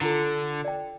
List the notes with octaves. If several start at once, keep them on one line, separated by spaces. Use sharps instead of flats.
D3 E4 F4 A4
D5 G5